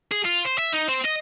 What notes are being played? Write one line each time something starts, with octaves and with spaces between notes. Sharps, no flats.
G#4
F4
C5
E5
D#4
C4
D#5